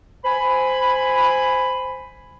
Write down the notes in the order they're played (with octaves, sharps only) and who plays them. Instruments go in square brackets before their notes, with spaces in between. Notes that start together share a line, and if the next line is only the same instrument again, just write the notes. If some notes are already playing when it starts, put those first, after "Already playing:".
[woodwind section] C5 G#5 B5